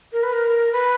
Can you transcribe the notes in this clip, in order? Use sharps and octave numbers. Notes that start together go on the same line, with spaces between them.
A#4
B4
A#4
B4